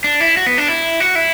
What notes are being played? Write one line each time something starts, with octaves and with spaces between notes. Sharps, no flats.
D4
E4
F#4
B3
D4
E4
F#4
E4